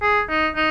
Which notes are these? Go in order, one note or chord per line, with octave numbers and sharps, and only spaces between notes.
G#4
D#4
D#4